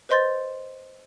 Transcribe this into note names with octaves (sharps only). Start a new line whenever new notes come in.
B4 C5 D#5 C6 G6 A6